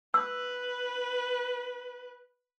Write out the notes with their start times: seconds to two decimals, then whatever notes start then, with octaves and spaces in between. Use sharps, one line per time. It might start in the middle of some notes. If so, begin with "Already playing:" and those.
0.14 B4 E6